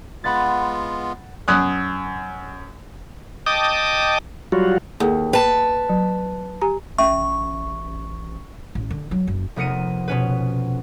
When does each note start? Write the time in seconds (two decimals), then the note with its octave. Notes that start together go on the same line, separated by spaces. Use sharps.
0.24 G#3 B3 F4 F#5 B5 A6
1.48 F#2 D#6 F#6
3.46 D#5 G5 A5 D6 D#6
4.52 F#3 G3 F4 F#4
5.00 D#2 A#3 G#4 A4
5.33 B4 G5 A5
5.89 F#3
6.62 G4 G#5 A#5
6.98 A1 C#4 E5 C#6
8.75 A1
8.90 D3
9.11 F#3
9.27 F#1
9.56 F1 B3 A#4 C#7 D#7
10.08 B2 C#4 B4